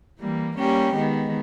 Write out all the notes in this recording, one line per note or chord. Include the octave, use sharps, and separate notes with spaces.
E3 G3 A#3
G3 A#3 C#4 G4
D#3 G#3 B3